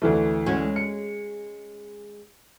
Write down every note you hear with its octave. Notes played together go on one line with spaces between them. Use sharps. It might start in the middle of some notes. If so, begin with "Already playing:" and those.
D2 E3 A3
G#3 C#4 F#4
C#7